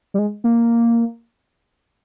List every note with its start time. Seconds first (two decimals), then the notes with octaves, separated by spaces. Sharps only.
0.14 G3
0.19 G#3
0.44 A#3